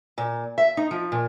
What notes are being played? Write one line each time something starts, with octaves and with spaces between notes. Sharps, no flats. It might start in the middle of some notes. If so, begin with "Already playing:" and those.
A#2
E5
D#4
F3
A#2